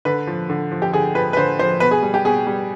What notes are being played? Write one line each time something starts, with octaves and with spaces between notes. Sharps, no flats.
D3 B4
F3
D3
F3
G4
D3 G#4
F3 B4
B4
D3 C5
F3 C5
B2 B4
G#4
G3
G4
B2 G#4
G3